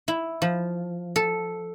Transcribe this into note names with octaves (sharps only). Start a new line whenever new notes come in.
E4
F3
A4